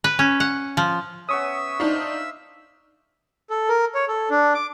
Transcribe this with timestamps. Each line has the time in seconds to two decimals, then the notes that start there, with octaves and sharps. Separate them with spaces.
0.04 B4
0.19 C#4
0.40 F#5
0.77 F3
1.29 B3 C#4 E5 C#6 D#6 E6
1.80 D4 D#4 C5 D#5 F5
3.50 A4
3.69 A#4
3.95 C#5
4.08 A4
4.30 D4
4.55 D6